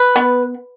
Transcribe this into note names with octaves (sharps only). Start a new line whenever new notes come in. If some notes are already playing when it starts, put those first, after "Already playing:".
Already playing: B4
B3